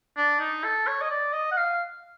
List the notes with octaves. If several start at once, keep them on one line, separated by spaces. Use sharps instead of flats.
D4
D#4
A4
C#5
D#5
D5
D#5
F#5
F5